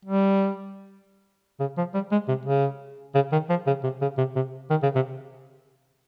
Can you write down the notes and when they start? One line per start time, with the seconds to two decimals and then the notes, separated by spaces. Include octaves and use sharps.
0.05 G3
1.60 C#3
1.77 F3
1.94 G3
2.12 G#3
2.28 C3
2.45 C#3
3.15 C#3
3.32 D#3
3.49 F3
3.67 C#3
3.84 C3
4.01 C#3
4.18 C3
4.36 C3
4.70 D#3
4.83 C#3
4.95 C3